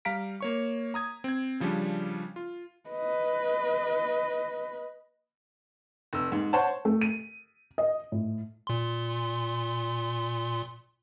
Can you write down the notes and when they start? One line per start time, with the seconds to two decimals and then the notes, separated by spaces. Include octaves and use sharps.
0.05 G3 F5 A#5 B6 D7
0.41 A#3 C#5 C#6
0.94 A#5 D#6 G#6
1.24 C4 G#6
1.60 C#3 F3 G3 C#4 D4
2.36 F4
2.90 B4 D#5
6.13 F1 E6
6.32 G#2
6.53 C5 C#5 F#5 A5
6.85 A3
7.01 D#7
7.78 D#5
8.12 A2
8.67 A#2 C6